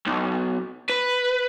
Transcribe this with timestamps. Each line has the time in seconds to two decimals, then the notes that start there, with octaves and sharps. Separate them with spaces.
0.06 B1
0.89 B4